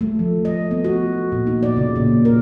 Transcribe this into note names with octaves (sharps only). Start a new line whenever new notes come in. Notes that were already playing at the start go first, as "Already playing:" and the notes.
A3
F3
D#5
B3
F#4
A#2
D#4
D5
C#3
A#2
A#4